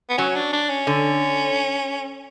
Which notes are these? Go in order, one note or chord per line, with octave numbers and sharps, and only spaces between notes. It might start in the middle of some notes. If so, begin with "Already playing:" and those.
B3
F#3 C#4
D4
D4
C#4
D3